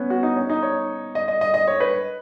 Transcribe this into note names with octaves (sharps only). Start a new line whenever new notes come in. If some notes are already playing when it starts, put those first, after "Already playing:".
Already playing: B3 C#4
F#4
D#4
C#4
D#4
C#5
D#5
D#5
D#5
D#5
C#5
B4